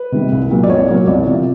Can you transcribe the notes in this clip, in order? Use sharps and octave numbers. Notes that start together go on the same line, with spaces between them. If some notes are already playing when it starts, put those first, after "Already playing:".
Already playing: B4
C3 D#3 G3 A#3
C2
A#2 F#3 A#3
D5
C2 C#5
A#2 F#3 A#3
C2 D5
C3 F3